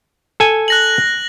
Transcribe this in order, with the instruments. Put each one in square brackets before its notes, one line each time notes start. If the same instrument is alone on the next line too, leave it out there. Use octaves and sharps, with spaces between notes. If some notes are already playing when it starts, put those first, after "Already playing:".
[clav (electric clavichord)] A4 G#5
[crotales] F#6 A#6 F#7